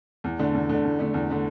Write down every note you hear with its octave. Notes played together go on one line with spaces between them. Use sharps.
E2
D3 A3 D4
E2
D3 A3 D4
E2
D3 A3 D4
E2
D3 A3 D4